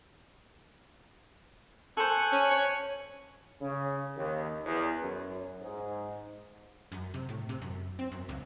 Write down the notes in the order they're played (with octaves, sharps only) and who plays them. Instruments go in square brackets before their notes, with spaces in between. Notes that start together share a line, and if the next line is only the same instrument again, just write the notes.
[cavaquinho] A4 C5 [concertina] G#5 C#6 F#6
[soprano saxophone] C#4
C#5
[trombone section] C#3
D#2
E2
F#2
G#2
[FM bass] F#2
C3
A2
C3
F#2
C4
F#2
C#2